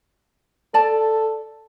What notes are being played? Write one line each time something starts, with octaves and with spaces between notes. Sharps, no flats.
A4 D5 A5